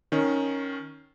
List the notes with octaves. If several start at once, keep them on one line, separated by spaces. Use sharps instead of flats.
D#3 C#4